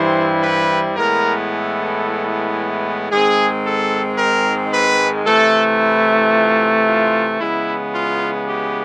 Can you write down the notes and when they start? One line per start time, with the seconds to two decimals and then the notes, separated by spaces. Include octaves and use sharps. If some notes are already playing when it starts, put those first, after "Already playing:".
Already playing: G2 E3 G3 C4 E4 C5
0.43 B4
0.96 A2 E3 G#3 B3 A#4
1.50 A4
3.10 G#2 D#3 G#3 C4 G#4
3.64 A4
4.17 A#4
4.72 B4
5.25 C3 E3 A3 A4
5.79 E4
6.33 F4
6.87 F4
7.39 C#3 E3 G#3 B3 E4
7.93 F4
8.48 G4